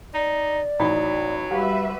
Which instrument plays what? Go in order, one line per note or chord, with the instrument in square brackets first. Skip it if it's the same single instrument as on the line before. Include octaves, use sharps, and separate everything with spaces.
[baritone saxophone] D#4 [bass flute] D5
[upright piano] A1 D#4 B5 [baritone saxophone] F#3
[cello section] G3 B4 E5 [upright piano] F#4 G4 F5